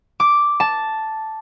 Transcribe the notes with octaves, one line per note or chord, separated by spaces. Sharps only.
D6
A5